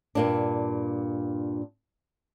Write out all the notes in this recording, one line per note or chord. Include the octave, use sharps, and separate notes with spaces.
G2 A#2 D4